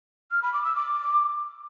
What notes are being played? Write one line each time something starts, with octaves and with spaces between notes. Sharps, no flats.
F6
B5
D6
E6
D6